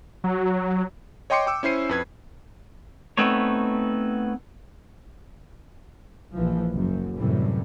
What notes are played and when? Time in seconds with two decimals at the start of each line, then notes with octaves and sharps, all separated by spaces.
0.24 F#3
1.30 C#5 D#5 G5 C6 D6 C#7
1.46 G5 D6 E6
1.63 C#4 E4 C5 C7 D#7
1.89 F2 B4 G#6
3.17 A3 B3 C4 D#4 C#5
6.35 A#1 E3 F3
6.73 F#1 F#2
7.16 F#2 A2 C3 E3 G3